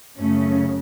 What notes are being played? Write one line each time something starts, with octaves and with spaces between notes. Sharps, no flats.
F#2 C#3 A3 C#4